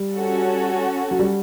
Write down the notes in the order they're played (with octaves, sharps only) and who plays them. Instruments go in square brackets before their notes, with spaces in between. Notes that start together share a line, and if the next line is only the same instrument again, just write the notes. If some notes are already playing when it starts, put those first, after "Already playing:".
Already playing: [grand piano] G3
[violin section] C#4 F#4 A4
[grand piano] F#3
G3